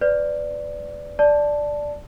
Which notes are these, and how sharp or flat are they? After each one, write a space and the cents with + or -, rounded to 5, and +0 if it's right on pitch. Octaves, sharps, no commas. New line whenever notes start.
B4 +30 D5 +0
D5 +0 A5 +0